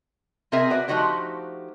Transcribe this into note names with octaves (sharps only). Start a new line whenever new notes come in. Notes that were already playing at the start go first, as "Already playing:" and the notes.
C3 C4 G#4 A#4 E5 G#5
F#4 B4 D5
F3 A3 D#4 F#4 G4 C5